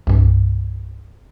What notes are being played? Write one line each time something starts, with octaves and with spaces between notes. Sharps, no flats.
C2 G2